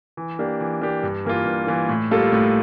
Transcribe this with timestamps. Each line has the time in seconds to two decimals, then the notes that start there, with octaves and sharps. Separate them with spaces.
0.17 E3
0.39 A#3 D4 G4
0.60 E3
0.81 A#3 D4 G4
1.03 G2
1.25 E3 A#3 F4
1.45 G2
1.67 E3 A#3 F4
1.89 A2
2.11 G3 A#3 F4 A4
2.32 A2